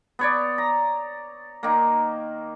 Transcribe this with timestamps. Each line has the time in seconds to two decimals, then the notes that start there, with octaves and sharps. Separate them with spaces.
0.19 B3 C#5 D5
0.58 A#5
1.63 D#3 A#3